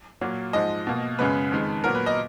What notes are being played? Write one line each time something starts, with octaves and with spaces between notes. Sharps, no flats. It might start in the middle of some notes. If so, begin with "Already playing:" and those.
A#2 F#3 A#3
G#2 F3 G#3 D#5
B2 A#3
F#2 C#3 G#3 B3 B4
F2 D#3 G#3
A#2 F#3 B3 A#4
B4
D#5